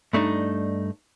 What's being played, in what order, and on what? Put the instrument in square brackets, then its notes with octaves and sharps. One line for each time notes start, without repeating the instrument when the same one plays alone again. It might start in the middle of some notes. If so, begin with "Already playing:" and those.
[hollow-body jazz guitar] G2 A3 D4 D#4